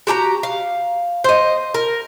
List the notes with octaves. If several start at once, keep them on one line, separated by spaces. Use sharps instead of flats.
F#4 G4 A5 A#5
F5
C5 D#5
A#4